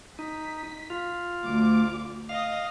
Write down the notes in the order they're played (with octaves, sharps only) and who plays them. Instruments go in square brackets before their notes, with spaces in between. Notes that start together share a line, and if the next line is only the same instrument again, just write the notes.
[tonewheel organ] D#4 [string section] B6
[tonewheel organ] F4
[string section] D2 D6
[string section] D#5 D#6 [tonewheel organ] F5